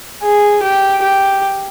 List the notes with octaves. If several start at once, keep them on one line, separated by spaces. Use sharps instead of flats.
G#4
G4
G4